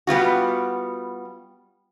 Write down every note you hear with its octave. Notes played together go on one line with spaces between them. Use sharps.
G3 B3 F4 F#4